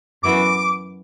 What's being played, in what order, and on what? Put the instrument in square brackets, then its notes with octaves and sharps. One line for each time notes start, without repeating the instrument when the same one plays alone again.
[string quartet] F#2 E3 B3 F#4 [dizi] D6